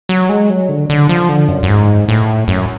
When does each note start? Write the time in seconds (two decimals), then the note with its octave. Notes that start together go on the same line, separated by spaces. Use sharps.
0.09 F#3
0.29 G#3
0.50 F#3
0.69 D3
0.90 D3
1.09 F3
1.29 D3
1.48 F#2
1.63 F#2
1.69 G#2
2.08 A2
2.48 F#2